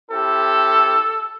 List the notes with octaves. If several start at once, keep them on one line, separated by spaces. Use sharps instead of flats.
C4 E4 G4 A4